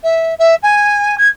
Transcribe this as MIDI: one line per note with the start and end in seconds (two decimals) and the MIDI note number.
0.03 0.34 76
0.38 0.54 76
0.62 1.15 80
1.17 1.28 92